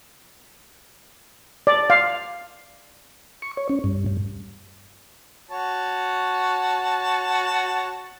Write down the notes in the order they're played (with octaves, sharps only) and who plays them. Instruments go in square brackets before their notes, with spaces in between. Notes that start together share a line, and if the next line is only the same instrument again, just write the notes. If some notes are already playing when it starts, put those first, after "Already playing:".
[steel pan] D5
F5
[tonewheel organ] C#6
C#5
C#4
G2
G2
[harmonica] F#4 C#5 A5